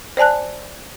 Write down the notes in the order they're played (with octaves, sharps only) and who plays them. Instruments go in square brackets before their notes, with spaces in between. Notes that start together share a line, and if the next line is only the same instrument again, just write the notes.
[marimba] C5 D5 G#5 A5 F#6